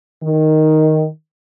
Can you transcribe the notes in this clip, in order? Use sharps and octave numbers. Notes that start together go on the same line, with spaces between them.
D#3